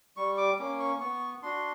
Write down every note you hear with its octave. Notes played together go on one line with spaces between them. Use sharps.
G3 C#6
D6
A#3 C#4 D6
C#6
B3 C#6
D4 F#4 C6